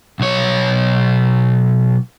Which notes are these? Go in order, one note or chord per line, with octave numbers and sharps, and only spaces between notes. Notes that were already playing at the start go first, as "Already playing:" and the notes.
B1 C#5